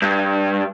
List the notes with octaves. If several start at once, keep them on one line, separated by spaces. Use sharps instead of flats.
G2